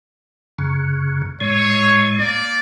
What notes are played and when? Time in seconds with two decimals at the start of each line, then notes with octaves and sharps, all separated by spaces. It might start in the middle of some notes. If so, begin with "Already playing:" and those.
0.59 F#2 C#3
1.41 A2 G#3 C#5
2.19 A#3 D5